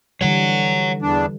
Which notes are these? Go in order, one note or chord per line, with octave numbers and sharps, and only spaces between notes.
D3 E3 G3 C#5 F#5
E2 D4